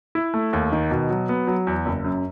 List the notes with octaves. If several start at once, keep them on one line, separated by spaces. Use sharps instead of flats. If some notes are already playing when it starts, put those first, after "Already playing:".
E4
A3
D#2
D#3
B2
F#3
B3
F#3
E2
F#1
F#2